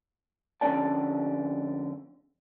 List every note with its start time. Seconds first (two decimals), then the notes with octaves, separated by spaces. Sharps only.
0.61 F2 D3 A#3 C#4 D5 A5